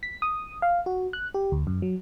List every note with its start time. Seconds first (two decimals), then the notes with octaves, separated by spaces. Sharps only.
0.03 B6
0.22 D#6
0.62 F5
0.86 F#4
1.13 F#6
1.34 G4
1.52 D2
1.67 F#2
1.82 F#3